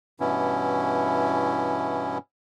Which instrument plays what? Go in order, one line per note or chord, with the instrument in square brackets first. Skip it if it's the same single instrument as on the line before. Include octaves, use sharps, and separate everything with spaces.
[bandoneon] G2 B2 E3 B3 C#4 E4